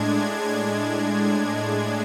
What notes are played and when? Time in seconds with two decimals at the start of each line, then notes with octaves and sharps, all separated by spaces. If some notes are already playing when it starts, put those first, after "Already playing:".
Already playing: A2 G#3 D4 G#6
1.01 G#6